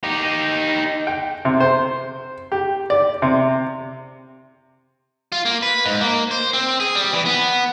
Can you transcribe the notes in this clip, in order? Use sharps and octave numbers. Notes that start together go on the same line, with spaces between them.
D#4 G4
G5
C3
C5
G4
D5
C3
F4
A#3
B4
G#2
A#3
C5
C4
G#4
G3
E3
B3